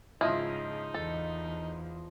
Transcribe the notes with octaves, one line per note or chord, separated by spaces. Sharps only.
G#2 C#3 F3 D#4 E4 D#5
E2 A4